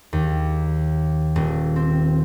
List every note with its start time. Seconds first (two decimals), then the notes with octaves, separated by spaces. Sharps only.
0.13 D#2
1.36 D#1
1.76 C4